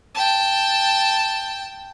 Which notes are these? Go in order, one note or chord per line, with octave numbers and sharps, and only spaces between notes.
G5 A5